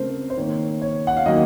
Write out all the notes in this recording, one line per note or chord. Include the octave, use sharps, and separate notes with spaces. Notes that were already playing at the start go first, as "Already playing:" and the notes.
Already playing: C#3 A3 C4 A#4 C5
C5
D#3 A#3 C#5
C#5
F#5
F5
D#3 F#3 A#3 D#5